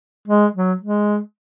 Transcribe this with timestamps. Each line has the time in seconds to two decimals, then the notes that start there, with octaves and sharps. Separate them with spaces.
0.28 G#3
0.55 F#3
0.81 G#3